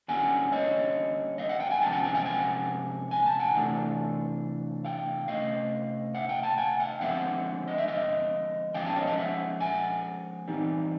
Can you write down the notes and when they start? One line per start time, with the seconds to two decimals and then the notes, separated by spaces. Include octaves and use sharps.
0.08 D3 G3 A#3 C#4 F#5 G#5
0.52 C#5 D#5
1.38 D#5 F5
1.49 E5 F#5
1.60 F5 G5
1.71 F#5 G#5
1.82 C3 F3 G#3 C#4 G5 A5
1.92 F#5 G#5
2.04 F#5 G#5
2.14 F5 G5
2.25 F#5 G#5
3.11 G#5
3.26 A5
3.39 F#5 G#5
3.55 C3 E3 A3 D4
4.85 F5 G5
5.28 C3 E3 A3 C#4 D#5 F5
6.15 E5 F#5
6.29 F5 G5
6.43 G5 A5
6.57 F#5 G#5
6.80 F5 G5
7.01 D3 F3 G#3 C4 E5 F#5
7.68 D#5
7.78 E5
7.88 D#5 F5
8.74 F3 G#3 C#4 F5 G5
8.85 G5 A5
8.96 C#5 D#5
9.07 D#5 F5
9.18 E5 F#5
9.60 F#5 G#5
10.48 E3 G3 C4 D#4